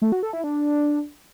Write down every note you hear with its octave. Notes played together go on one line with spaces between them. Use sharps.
A3
F#4
A4
E4
D4